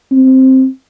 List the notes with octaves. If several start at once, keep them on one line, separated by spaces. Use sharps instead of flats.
C4